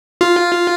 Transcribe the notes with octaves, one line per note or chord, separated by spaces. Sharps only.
F4